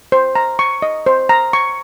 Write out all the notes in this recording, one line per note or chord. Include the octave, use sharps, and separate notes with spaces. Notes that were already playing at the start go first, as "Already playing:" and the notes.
C5
A#5
C#6
D#5
C5
A#5
C#6